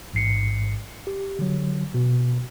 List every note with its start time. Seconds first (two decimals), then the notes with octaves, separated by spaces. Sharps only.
0.14 A1 G#2 C7 C#7
1.07 G4
1.39 D3 F#3
1.94 B2